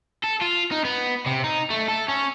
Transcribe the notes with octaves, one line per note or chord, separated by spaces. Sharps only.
A4
F4
D#4
B3
C3
D#4
A3
A4
C#4